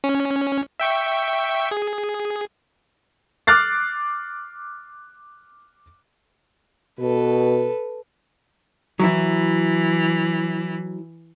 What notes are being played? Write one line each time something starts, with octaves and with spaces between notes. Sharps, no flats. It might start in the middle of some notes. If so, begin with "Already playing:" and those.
C#4
E5 G5 C#6
G#4
D6 F6 F#6 A6 C7
B2 A4 B4
E3 F#3 E4